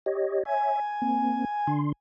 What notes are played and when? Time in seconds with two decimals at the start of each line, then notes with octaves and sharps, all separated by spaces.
0.06 G4 C#5 D#5
0.45 C#5 E5 G#5
1.02 A#3 C4
1.67 D3 D4 C6